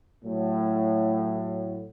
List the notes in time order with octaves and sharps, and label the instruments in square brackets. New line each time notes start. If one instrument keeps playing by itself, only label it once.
[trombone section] A2 F#3